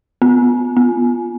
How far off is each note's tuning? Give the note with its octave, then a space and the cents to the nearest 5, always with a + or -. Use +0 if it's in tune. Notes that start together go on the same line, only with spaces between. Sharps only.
B3 +5
B3 -10